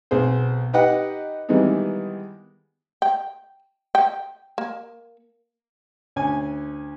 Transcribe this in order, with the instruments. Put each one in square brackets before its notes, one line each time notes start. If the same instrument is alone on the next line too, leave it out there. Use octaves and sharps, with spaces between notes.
[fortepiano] B1 C4 G#4 C5
D#4 G4 B4 D#5 F#5 G5
D#3 E3 G3 G#3 B3 D#4
[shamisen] G5
G5
A#3
[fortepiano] D2 C#4 G#5